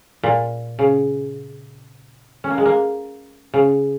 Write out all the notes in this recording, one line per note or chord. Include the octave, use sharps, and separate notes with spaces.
A#2
C#3
C#4
A#3
G#3
A#3
C#3